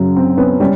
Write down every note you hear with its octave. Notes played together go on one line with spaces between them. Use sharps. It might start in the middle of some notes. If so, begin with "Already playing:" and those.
Already playing: F#2 C#3 F#3
C4
B3 C#4
G3 C#4